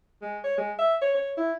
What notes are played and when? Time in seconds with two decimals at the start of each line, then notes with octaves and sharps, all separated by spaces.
0.22 G#3
0.44 C#5
0.58 G#3
0.79 E5
1.02 C#5
1.15 C#5
1.37 E4